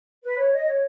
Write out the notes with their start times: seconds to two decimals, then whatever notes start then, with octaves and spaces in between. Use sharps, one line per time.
0.24 B4
0.37 C#5
0.53 D#5
0.67 C#5